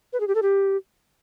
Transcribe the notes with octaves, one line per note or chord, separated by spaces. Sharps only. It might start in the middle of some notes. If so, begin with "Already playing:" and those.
B4
G#4
G4
A4
G4